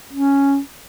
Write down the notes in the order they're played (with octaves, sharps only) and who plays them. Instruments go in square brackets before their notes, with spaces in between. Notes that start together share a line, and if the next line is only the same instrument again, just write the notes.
[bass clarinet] C#4